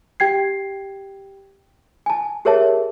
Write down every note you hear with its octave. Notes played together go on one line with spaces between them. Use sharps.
G4 G5 G#6 C7
G#5 A5
G4 G#4 A#4 C#5 E5 A5